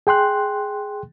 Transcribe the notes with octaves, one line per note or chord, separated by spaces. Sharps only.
G#4 G5 C6 F#6